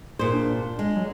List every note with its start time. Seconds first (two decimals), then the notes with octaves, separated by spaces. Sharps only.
0.19 A#2 G#4 C5
0.33 D4
0.79 G#3
0.96 F#3